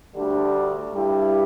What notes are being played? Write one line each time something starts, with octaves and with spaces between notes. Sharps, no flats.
D2 D3 G3 D4 G4
G2 G3 E4 G4